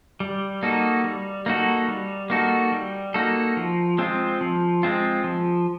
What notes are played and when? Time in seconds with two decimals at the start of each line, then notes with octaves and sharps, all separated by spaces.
0.20 G3
0.63 A#3 D#4 F#4 A4
1.04 G3
1.46 A#3 D#4 F#4 A4
1.88 G3
2.30 A#3 D#4 F#4 A4
2.72 G3
3.14 A#3 D#4 F#4 A4
3.57 F3
3.98 G#3 C4 F4
4.41 F3
4.83 G#3 C4 F4
5.24 F3